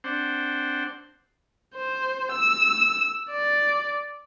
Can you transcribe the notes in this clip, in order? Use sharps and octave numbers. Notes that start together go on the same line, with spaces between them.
C4 D4 C5 F#5
C5
E6
D5